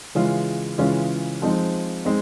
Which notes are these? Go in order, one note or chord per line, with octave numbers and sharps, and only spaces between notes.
C#3 E3 G#3 C#4 F4
C#3 E3 G#3 C#4 F4
F3 G#3 C4 D#4
G#3 C4 D#4